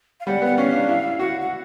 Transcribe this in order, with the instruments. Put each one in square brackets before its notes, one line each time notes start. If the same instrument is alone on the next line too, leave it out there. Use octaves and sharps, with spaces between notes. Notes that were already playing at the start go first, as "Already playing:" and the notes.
[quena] F5
[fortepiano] G3 [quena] F#5
[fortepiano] B3 [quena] F#5
[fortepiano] C#4 [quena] F5
[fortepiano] D4
E4
[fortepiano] F#4 [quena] F#5
[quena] F#5